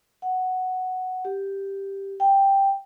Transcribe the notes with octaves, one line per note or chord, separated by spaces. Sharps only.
F#5
G4
G5